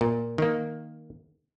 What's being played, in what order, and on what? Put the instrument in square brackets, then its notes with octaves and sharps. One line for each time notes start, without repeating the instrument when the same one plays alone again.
[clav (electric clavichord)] A#2
D#3 A#3